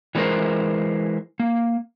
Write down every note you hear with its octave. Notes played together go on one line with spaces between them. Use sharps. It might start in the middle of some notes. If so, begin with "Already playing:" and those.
E3 G3 G#3 B3 A#4 C5
A#3